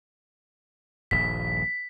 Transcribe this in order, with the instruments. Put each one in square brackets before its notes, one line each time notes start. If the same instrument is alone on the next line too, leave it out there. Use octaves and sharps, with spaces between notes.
[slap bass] D#1 A#1 G2 [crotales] B6